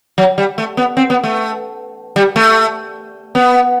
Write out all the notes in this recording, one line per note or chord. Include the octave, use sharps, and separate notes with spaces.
F#3
G3
A3
B3
C4
B3
A3
G3
A3
B3